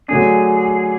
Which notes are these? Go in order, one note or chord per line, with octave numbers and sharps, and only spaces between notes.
D3 F#3 A3 D4 G#4